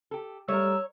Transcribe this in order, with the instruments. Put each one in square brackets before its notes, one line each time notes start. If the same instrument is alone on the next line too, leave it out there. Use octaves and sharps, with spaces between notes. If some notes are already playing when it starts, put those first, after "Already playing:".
[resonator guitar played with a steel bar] G4 A4
[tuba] G3 [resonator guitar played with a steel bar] A3 A#4 [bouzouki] C#5 [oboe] E6